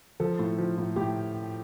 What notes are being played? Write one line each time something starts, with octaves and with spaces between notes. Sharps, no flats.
F3 A4
A2
F3
A2
A2 G4